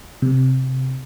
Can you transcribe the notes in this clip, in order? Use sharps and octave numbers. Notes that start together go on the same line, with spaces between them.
C3